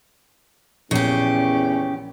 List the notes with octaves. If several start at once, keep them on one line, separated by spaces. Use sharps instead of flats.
A#1 E2 C#3 C#4 G4